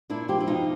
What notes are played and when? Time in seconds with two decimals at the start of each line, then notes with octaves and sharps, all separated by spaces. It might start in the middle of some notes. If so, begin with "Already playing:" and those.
0.10 A#2 D4 E4
0.28 F3 F4 G4
0.40 E4
0.47 B2 D#4 F4